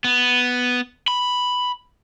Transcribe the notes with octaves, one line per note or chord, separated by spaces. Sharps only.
B3
B5